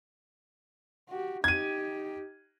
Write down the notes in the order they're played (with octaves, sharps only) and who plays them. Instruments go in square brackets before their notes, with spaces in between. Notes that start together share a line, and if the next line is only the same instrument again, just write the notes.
[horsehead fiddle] F#4 G4
[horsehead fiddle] D#4 G4 [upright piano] G#6 D#7